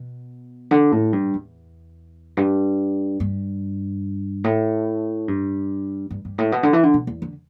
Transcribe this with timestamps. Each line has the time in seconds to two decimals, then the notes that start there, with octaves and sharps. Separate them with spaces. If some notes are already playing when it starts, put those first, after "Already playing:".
Already playing: B2
0.71 D3
0.92 A2
1.13 G2
1.34 E2
2.37 G2
3.20 G2
4.44 A2
5.28 G2
6.11 G2
6.25 G2
6.38 A2
6.52 B2
6.63 D3
6.73 E3
6.83 D3
6.94 B2
7.07 E2
7.22 D3